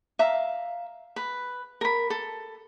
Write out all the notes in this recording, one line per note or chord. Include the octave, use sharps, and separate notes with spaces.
E5 F5 A#5
B4
A#4 B5
A4